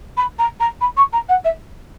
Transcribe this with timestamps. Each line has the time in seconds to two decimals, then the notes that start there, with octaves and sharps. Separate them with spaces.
0.17 B5
0.39 A#5
0.60 A#5
0.81 B5
0.97 C#6
1.13 A#5
1.29 F#5
1.44 E5